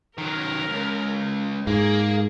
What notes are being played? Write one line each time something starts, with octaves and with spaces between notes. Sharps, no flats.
D#3 F#3 A#4
C#2
G#2 A#3 G#4